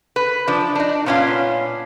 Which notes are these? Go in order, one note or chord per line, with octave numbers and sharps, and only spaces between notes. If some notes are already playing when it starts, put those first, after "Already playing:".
B4
F3 D4
D4 D#4
A#2 B3 C#4 D4 F4